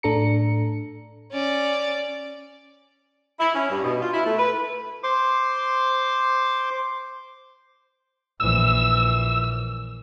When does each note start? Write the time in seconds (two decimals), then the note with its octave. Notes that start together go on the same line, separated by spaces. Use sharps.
0.03 A2 D4 A4 A#5 C#7
1.32 C#4 D5
3.40 E4
3.55 C#4
3.70 G2
3.83 B2
4.01 F4
4.13 E4
4.25 A3
4.38 B4
5.03 C5 C6 D6
8.40 A#1 E3 E6